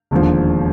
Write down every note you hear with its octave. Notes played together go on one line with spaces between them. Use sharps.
E1 D#2 D3 F3